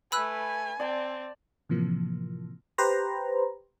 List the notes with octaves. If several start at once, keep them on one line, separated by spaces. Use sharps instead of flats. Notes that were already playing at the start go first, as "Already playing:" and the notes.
A3 B4 G#5 B5 E6 F#6
C4 D5 A5
A2 C3 E3 F3 A#3
G4 B4 C5 A#5